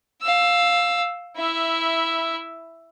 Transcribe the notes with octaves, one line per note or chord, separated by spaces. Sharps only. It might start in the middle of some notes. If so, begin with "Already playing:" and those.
F5 E6
E4 E5